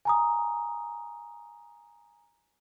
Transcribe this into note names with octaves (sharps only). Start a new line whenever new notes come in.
G#5 A#5 D#6